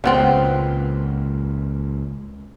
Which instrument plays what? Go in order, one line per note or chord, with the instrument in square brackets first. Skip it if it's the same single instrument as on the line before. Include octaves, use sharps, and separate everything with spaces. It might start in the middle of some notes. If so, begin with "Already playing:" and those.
[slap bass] C#2 A#2 [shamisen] C#3 B3 C4